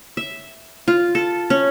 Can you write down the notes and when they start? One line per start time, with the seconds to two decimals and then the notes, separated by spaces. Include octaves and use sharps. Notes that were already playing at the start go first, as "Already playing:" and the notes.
0.17 E5
0.88 F4
1.15 A4
1.50 C#4